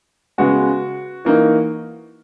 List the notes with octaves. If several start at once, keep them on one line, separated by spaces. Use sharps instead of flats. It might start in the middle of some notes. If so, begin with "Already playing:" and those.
C#3 G#3 B3 F#4
E3 A#3 D#4